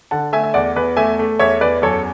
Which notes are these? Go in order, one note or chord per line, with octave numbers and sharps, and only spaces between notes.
D3 F#5 A5
A3 E5 G#5
E5
E2 D5 F#5
E2 B4
A3 E5 G#5
A3
E2 C#5 E5
E2 B4 D5
F#2 A4 C#5